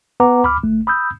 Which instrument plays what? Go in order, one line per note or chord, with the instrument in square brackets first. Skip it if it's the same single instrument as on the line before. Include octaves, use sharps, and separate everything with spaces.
[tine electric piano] B3 B4 F#5 A#5 D6
D2 B5 D6 F6
G1 A3
B5 D#6 E6 G6